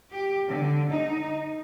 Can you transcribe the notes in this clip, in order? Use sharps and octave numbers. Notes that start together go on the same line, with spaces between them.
G4
D3
D#4